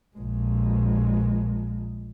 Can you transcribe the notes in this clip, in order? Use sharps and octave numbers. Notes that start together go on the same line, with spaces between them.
A#1 G#3